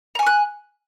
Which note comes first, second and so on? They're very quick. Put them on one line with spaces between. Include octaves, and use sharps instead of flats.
A#5 G#5 C#6 F#6